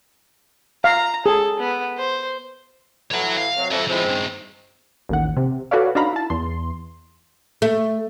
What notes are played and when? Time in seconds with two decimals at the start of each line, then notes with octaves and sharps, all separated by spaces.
0.84 F5 A#5
1.26 G#4 A4
1.59 B3
1.98 C5
3.11 A2 E3 C#5 F#5
3.38 F5
3.56 C3 F#3
3.71 F2 C#5 E5
3.88 F3 G#3 C4 E4
4.05 G2 D#3
5.09 A1 D#2 F#5
5.37 C3
5.71 F#4 A4 B4 C#5 D5 F5
5.95 D4 D#4 F#4 F5 A#5 B5
6.13 E4 A5
6.30 E2 C6
7.62 A3